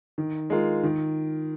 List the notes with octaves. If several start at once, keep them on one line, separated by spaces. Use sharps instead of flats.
D#3
G#3 F4 A#4
D#3